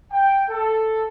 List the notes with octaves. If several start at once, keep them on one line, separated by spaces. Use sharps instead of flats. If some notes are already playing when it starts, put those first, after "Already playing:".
G5
A4